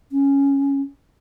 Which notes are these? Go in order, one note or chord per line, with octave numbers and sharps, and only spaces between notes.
C#4